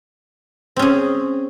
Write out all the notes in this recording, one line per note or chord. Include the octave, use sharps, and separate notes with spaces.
C4 C#4 G#4